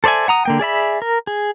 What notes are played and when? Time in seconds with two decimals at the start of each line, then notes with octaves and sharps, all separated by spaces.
0.04 A4 C5 D5 E5 G#5
0.28 F#5 A#5 D#6
0.45 D3 A#3 G5
0.59 G#4 D5 E5 B5
1.02 A#4
1.27 G#4